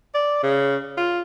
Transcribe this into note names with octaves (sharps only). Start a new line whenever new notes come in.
D5
C#3
F4